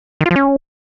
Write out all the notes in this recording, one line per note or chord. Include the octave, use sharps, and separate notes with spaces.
D#3
F4
F3
C#4